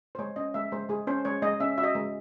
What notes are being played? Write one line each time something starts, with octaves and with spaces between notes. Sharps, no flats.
C5
G#3 C#5
C#4 D#5
G#3 E5
G#3 C5
G#3 G#4
C#4 C5
G#3 C#5
G#3 D#5
C#4 E5
F#4 E5
D#5
G#3